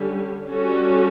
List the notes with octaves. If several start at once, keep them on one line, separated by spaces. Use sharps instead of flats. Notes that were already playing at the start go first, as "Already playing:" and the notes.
Already playing: D3 G3 C#4 G4
G3 C#4 F#4 A4